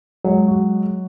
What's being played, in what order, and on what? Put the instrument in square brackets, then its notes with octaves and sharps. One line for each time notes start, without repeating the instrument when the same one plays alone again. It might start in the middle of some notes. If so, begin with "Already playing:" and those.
[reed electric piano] F#3 [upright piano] G#3
[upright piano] F#4